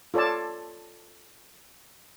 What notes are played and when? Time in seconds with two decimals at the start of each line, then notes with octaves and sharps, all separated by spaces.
0.14 F4 A4 C#5 D5 A5